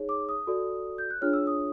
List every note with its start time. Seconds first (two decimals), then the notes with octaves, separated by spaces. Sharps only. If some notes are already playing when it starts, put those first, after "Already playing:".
Already playing: D#4 G#4 C#5
0.09 D6
0.29 D#6
0.47 F#4 A4 D5
0.98 G6
1.11 F#6
1.21 D4 F4 G#4 C#5 F6
1.33 E6
1.47 D#6